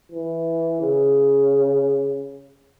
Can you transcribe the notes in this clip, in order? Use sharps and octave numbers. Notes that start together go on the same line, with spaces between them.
E3
C#3